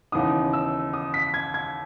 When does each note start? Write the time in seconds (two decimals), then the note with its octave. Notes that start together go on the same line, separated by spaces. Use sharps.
0.12 D#2 C#3 E3 B3 D#4 D#6
0.53 E6
0.93 D#6
1.14 B6
1.34 G#6
1.54 G#6